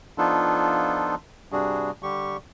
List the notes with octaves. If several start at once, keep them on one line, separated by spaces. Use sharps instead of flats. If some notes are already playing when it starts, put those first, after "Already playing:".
F3 B3 D4 D#4 F4 A4
G2 C3 G3 D4 F#4 G#4
D3 G3 G4 C#6